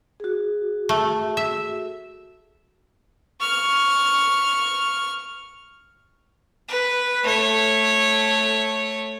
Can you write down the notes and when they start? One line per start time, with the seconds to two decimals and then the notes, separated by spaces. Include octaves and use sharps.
0.20 F#4 G#4
0.89 A3
1.37 E5
3.41 C#6 F6
6.68 B4
7.23 A3 C#5